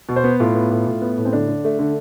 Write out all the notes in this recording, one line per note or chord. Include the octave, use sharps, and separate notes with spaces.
B2
C5
B3
A2 F4
B3
A2
A2
B3
A2
C4
D3 D4
D3
A3
D3